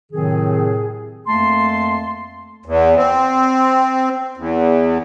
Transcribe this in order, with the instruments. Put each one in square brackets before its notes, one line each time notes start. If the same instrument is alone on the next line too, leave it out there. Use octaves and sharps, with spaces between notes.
[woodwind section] A2 C3 D#3 F#3 C4 G#4
F2 A3 A#3 A5 C6
[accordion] E2
C4
E2